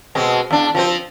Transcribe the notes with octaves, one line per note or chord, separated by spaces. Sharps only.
B2 G#3 C4
E2 D4
F3 C4 C5